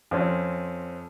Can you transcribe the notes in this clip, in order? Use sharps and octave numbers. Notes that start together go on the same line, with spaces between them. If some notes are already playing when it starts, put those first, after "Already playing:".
F2 C4 C#4